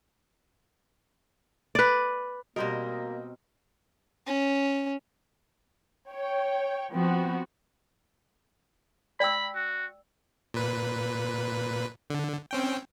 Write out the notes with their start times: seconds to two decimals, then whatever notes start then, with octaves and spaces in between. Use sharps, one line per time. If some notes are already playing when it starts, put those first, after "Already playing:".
1.75 B4 D5
2.56 B2 G3 A#3 C4 F#4 A#4 D#5 A#6
4.27 C#4
6.08 C#5 G5
6.92 F3 B3 C4 F#4
9.20 D5 G5 B5 E6
9.55 F#4
10.54 A#2 B4
12.10 D3
12.51 C4 C#4 G5